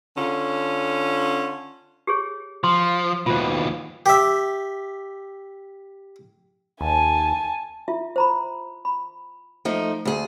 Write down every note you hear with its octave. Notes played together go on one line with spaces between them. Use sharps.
D3 C#4 F4
G4 G#4 C#5
F3 C6
D#2 B2 F4 C5
G4 E5
D#2 G#5 A5
E4 F4 E5
C5 A#5 B5
B5
F3 A3 D#4
D2 G#4